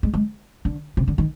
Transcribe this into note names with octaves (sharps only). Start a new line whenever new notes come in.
G#3
G#3
D3
C3
D3
D#3